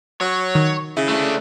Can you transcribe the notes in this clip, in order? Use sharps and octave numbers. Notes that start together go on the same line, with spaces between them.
F#3 C#5
D#3
C#3 E4
A3 D4